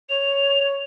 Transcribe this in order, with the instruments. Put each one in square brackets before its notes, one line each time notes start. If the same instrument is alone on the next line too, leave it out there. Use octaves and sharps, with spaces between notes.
[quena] C#5 [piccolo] F7